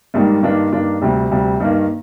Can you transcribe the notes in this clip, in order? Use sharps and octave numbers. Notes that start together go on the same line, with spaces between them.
G#2 D#3 G3 A#3 D4
G2 D#3 A#3 D4
G2 D#3 A#3 D4
D2 C3 G3
D2 C3 G3
G2 D#3 A#3